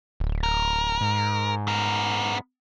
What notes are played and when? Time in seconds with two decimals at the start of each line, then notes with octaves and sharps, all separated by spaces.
0.20 D1
0.43 A#4
1.01 G#2
1.68 B3 A#4